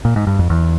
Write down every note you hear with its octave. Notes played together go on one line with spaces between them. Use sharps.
A#2
G#2
G2
F2
E2